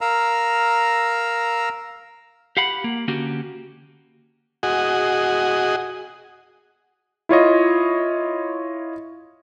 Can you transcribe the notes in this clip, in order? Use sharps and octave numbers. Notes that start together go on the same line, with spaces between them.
A#4 F5 A#5 E6
G4 F5 F#5 B5
A#3
D3 A#3 C#4 F#4 G4
F#4 G#4 D#5
E4 F4 C#5 D#5